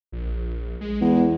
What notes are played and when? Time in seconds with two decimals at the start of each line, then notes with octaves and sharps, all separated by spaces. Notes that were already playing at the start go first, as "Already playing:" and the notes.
0.12 A#1
0.81 G#3
1.01 E2